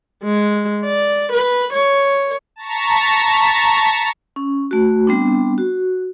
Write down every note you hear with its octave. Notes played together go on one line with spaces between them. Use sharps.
G#3
D5
B4
C#5
A5 A#5 C#6 B6
C#4
A3 F#4
G3 B3 C4 D4
F#4